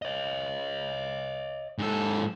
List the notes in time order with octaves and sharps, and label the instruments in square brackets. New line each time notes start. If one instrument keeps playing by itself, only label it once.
[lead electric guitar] C#5 D#5
[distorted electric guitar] G#2 A4